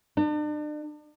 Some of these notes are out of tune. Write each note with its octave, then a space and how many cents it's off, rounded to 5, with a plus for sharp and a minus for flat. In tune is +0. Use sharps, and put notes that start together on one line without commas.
D4 +40